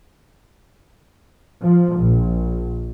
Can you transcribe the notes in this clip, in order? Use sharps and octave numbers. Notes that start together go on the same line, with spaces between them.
F3
A#1